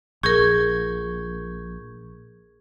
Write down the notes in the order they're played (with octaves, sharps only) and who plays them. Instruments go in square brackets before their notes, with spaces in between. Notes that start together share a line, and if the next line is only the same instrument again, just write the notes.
[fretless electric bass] A#1 [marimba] G#4 A#4 [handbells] C#6 G6 G#6